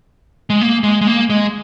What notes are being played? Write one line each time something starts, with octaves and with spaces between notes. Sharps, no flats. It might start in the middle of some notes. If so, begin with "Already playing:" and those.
G#3
A#3
G#3
G#3
A#3
G#3